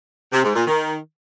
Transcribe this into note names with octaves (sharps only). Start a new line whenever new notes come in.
C3
G#2
A#2
D#3